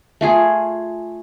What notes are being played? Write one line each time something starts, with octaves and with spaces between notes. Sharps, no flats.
A3 F4 G#4